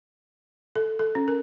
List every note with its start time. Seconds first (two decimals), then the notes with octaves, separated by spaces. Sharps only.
0.76 A4
0.99 A4
1.15 C#4
1.28 A#4